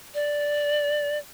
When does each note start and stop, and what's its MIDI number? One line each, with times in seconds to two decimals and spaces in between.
0.14 1.18 74